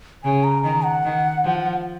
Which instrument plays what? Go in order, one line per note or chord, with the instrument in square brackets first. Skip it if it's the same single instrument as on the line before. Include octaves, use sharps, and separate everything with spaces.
[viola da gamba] C#3 [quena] G#5
[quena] A#5
[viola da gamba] D#3 [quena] A#5
[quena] F#5
[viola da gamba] D#3
F3